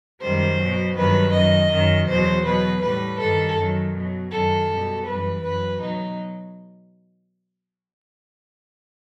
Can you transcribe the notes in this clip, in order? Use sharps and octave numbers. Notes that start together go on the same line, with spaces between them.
F#2 D#3 G3 C5
B2 F#3
G2 D#3 F#3 B4
F#2 D#3 F#3 D#5
F#2 D#3 F#3
E2 B2 F#3 C5
B2 F#3 B4
A2 G3 B4
G2 D#3 G3 A4
F#2 D#3 F#3
B2 F#3
F#2 D#3 F#3 A4
B2 G3
F#2 E3 G3 B4
F#2 F#3 B4
B2 F#3 D#4